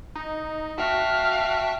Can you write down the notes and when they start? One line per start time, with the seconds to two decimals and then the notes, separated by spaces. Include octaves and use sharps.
0.15 D#4
0.78 F#4 E5 F5 G5 A5